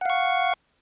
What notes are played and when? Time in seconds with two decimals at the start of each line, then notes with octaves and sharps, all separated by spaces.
0.01 F#5
0.05 F5
0.10 C#6